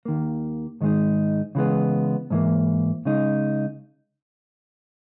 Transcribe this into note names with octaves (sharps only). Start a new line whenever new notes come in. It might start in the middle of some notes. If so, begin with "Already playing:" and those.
D#2 D#3 A#3
G#2 D#3 G#3 D#4
C#3 E3 G#3 B3
G#2 E3 A#3
C#3 G#3 D#4